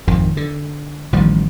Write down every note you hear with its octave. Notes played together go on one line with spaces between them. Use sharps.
G#1 F2 D#3
D3
A1 D#3 F3 G3